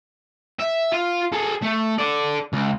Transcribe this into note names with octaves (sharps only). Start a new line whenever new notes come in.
E5
F4
G#4 A4
A3
A4 D5
C#2